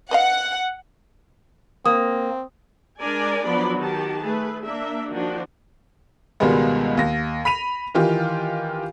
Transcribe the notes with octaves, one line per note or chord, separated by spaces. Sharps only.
B4 D#5 F5 F#5
A#3 C4 D#6
G#3 D4 A#4 D5 G#5
F3 F#3 B3 D4 D5 B5
D#3 F#4 G4 A5
A3 G#4 B4
A#3 D4 E5
D#3 F3 D4 F#4
C#2 B2 D#3 G3 G#3 B3
D#2 A#6
B5 B6 D#7 F7
D#3 E3 F4 G4